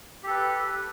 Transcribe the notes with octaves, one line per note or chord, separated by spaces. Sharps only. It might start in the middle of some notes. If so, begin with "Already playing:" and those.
G4 A4 B4